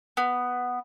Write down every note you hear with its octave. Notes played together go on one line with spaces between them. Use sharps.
B3